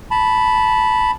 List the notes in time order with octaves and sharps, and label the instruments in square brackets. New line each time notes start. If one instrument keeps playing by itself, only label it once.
[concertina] A5 B5